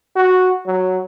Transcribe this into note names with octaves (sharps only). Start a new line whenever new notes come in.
F#4
F#3